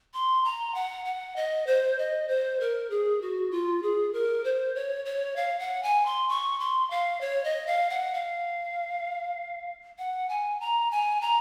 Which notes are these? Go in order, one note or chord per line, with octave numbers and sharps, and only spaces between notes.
C6
A#5
F#5
F#5
D#5
C5
D#5
C5
A#4
G#4
F#4
F4
G#4
A#4
C5
C#5
C#5
F5
F#5
G#5
C6
C#6
C6
F5
C#5
D#5
F5
F#5
F5
F#5
G#5
A#5
G#5
A#5